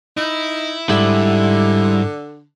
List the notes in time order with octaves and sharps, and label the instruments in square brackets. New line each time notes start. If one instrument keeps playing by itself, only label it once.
[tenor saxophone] D#4 [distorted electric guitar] E4
[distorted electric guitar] G#2 [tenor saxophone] D3 [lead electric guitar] G3 E4